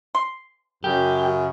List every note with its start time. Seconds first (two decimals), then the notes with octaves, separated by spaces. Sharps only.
0.15 C6
0.84 F#2 C#3 G4